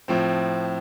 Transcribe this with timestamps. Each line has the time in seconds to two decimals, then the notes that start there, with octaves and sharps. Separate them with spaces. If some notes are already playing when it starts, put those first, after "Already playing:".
0.08 A2 F3 C4